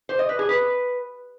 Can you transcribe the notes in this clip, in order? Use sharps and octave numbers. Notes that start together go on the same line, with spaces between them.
C5
D#5
B4
G#4
B4